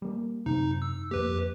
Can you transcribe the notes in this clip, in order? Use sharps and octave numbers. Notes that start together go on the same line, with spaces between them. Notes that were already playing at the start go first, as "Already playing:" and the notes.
G3 A#3
F#2 C3 D#4
E6
F2 A#3 G4 B4